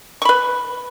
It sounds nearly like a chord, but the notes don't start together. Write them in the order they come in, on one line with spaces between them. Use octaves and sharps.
C#6 B5 B4